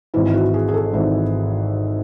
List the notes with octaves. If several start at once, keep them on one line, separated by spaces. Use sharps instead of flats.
G#1 G#2 E3 E4
F#4
G#4
G#4
A4
G#1 G#2 E3